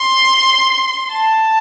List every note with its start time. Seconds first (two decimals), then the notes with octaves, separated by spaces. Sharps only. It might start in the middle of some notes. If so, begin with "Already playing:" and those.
Already playing: C6
1.13 A5